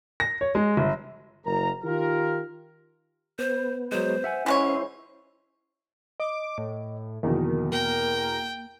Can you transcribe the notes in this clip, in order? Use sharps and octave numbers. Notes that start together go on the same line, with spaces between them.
A#6
C#5
G#3
G1
F#1 A#4 A#5
D#3 F4 G4 A#4
B3 C5
F#3 G#3 C5
E5 F#5 G#5
E3 G#3 C#4 E4 C5 C#5
D#5 D6
A2
E2 B2 D3 D#3 F3 A#3
A#3 A#4 G5